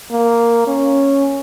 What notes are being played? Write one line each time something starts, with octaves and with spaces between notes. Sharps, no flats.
A#3
C#4